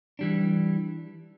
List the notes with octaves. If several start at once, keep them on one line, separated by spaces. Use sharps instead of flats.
E3 G3 D4